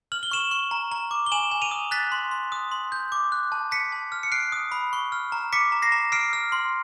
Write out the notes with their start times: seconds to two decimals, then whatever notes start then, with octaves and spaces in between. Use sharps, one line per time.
0.12 F6 F#7
0.23 G7
0.31 C#6 E7 F#7
0.51 C#6
0.71 A#5
0.92 A#5
1.11 D6
1.26 G7
1.32 G#5 E7 F#7
1.52 G#5
1.62 D#7 F7
1.71 D#6
1.91 F#6 A6 B6
2.12 C6
2.31 C6
2.52 D#6
2.71 C6
2.92 G6
3.12 D6
3.32 F#6
3.52 A5
3.71 A5 B6 C#7
3.92 A5
4.12 F6
4.23 C#7
4.32 F#6 C7 D7
4.52 D#6
4.72 B5
4.93 C#6
5.12 F6
5.32 A#5
5.53 D6 B6 C#7
5.72 A#5
5.82 A#6 C7
5.92 A#5
6.12 F6 C7 D7
6.33 F6
6.52 C6